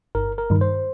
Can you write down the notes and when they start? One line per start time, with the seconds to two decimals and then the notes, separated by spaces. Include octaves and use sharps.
0.15 G1 A#4
0.38 A#4
0.50 G2 D#3
0.61 C5